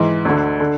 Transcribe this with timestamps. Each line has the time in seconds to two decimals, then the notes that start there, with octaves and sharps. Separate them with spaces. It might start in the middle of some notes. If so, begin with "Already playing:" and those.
Already playing: G#2 E3
0.25 D2 D3
0.60 D3